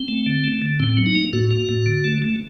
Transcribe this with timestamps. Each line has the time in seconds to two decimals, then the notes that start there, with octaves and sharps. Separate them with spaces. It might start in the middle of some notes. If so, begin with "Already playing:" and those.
Already playing: C4
0.08 A3
0.26 D3
0.44 A3
0.62 D3
0.80 A2 C4
0.97 F#3
1.06 D#4
1.15 A#3
1.33 A2 F#4
1.51 A#3
1.69 A2
1.86 D3
2.04 A3
2.22 A3